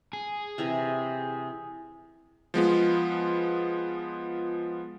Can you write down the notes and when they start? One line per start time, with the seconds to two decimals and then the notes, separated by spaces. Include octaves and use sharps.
0.13 G#4
0.58 C3 E3 A#5
2.54 F3 G#3 B3 F4